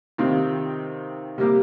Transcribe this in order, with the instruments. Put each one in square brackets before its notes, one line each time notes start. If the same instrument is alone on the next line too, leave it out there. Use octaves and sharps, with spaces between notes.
[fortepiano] C3 D#3 C4 F4
C3 G3 A#3 G4